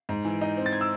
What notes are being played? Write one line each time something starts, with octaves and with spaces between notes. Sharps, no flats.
G#2
E3
D#4
C4
A6
G#6
E6